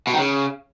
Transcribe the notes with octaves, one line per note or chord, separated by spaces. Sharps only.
B2
D#3
C#3